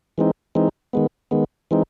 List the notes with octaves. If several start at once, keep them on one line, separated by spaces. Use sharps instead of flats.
E3 G#3 C4 D#4
E3 G#3 C4 D#4
D#3 G#3 B3
D#3 G#3 B3
E3 G#3 C4 D#4